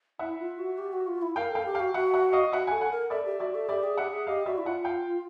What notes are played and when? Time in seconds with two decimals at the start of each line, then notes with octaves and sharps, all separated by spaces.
0.19 E4 E5 F#5
0.39 F4
0.59 F#4
0.78 G4
0.93 F#4
1.07 F4
1.22 E4
1.36 A#4 F5 G5
1.51 A4 F5 G5
1.66 G4
1.75 F5 G5
1.80 F#4
1.94 F#4 E5 F#5
2.14 E5 F#5
2.33 D#5 F5
2.52 F#4 E5 F#5
2.67 A4 F#5 G#5
2.81 F#5 G#5
2.91 A#4
3.10 A4 D5 E5
3.25 G4
3.40 F#4 D5 E5
3.55 A4
3.69 G4 D5 E5
3.84 G#4
3.97 G4 E5 F#5
4.13 G#4
4.27 G4 D#5 F5
4.46 F#4 D5 E5
4.58 E4
4.65 F4 E5 F#5
4.85 F5 G5